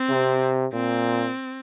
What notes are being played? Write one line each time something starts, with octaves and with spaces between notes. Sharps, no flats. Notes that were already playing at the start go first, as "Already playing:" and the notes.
Already playing: C4
C3
A#2 C4